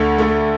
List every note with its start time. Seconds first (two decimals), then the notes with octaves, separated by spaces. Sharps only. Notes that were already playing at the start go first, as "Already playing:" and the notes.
Already playing: D2 D3 A3
0.18 D2 D3 A3